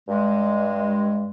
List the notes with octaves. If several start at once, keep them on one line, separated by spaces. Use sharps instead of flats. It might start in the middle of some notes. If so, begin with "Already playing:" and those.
G2 G#3